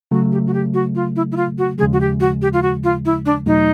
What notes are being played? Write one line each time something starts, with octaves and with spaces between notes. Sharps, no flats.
C#3 F#3 A3 F#4
G4
F#4
G4
F#4
F4
E4
E4
F4
F#4
D#2 C#3 F3 G#3 G#4
F#4
G4
F#4
G4
F4
F#4
F4
E4
D4
E2 B2 F#3 A3 D#4